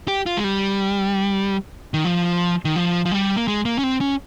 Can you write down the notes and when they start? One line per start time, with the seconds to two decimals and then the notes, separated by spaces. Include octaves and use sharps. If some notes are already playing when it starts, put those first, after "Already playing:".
0.08 G4
0.26 F4
0.37 G#3
0.44 G3
1.94 D#3
2.05 F3
2.65 D#3
2.76 F3
3.06 F3
3.12 G3
3.36 A#3
3.48 G#3
3.65 A#3
3.78 C#4
3.83 C4
4.01 C#4